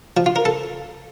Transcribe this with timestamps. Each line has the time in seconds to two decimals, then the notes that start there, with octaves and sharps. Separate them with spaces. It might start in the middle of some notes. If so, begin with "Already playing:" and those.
0.17 F3
0.26 F4
0.36 A#4
0.45 A4